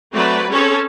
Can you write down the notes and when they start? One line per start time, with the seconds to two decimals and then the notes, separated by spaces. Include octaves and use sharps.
0.13 F#3 A3 C4 B4 D5
0.51 C4 C#4 G#4 A4 C#5